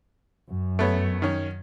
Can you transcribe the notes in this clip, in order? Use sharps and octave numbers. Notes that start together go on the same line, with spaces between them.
F#2
A3 B3 C#5
D#3 C#4